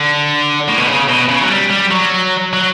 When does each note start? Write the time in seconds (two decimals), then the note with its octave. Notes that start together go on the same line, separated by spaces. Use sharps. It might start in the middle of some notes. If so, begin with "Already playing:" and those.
Already playing: D3
0.68 A2
0.77 B2
0.87 C#3
1.08 B2
1.29 C#3
1.41 F#3
1.49 G3
1.70 G3
1.91 F#3
2.53 F#3